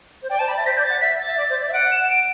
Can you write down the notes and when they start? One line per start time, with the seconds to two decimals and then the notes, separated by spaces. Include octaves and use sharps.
0.23 C5
0.30 D5 G5
0.39 C5 A5
0.48 D5 B5
0.57 E5 A6
0.65 C5 B6
0.77 D5 G6
0.84 A6
0.90 F#5
1.01 E5 B6
1.19 A6
1.27 E5
1.37 D5
1.50 C5
1.61 D5
1.68 E5
1.73 F#5 D7
1.91 E7
2.08 D7